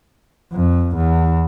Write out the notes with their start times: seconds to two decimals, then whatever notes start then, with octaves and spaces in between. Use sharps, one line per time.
0.53 F2
0.95 E2